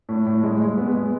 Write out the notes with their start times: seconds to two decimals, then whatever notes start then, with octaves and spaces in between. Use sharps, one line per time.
0.09 A2
0.27 A2
0.43 G#3
0.60 G#3
0.78 B3
0.95 G#3